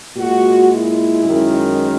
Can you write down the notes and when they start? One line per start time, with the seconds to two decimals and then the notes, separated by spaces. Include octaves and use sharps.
0.17 A#2 G#3 F#4
0.70 E4
1.24 F#2 D#3 G#3